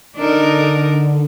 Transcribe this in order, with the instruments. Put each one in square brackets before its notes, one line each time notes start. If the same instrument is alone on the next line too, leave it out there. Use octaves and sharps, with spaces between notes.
[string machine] D3 [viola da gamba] D4 D#4 A#4